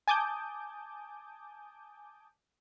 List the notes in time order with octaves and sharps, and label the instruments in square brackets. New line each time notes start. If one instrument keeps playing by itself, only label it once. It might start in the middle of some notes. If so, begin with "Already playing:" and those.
[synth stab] G#5 A5 D6 D#6 G6